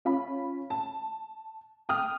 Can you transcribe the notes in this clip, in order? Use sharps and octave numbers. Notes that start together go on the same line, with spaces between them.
C#4 F4 B5
A5
G5 D#6 F6